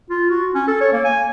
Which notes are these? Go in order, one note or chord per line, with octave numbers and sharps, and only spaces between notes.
F4
F#4
C#4
A4
C#5
A#3
G#5